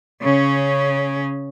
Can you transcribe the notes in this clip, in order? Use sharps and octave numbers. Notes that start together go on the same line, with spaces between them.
C#3 C#4